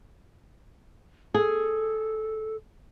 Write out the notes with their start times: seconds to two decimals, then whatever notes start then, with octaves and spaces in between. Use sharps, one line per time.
1.34 G#4 A4